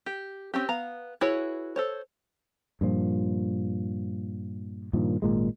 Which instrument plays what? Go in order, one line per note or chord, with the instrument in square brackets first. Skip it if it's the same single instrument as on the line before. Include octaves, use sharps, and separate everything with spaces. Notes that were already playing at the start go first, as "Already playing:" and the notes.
[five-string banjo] G4
C4 C#4 G4
B3 F5 A#5
E4 F#4 G#4 B4 C#5
A4 C5 C#5
[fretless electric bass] G2 A#2 F3
G2 A#2 D#3 F3
G#1 A#2 G#3